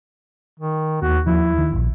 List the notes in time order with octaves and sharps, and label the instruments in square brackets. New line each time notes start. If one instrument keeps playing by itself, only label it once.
[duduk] D#3
[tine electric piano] D#2 [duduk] F#4
[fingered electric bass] F3 [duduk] E4
[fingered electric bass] D#3
E1 A#1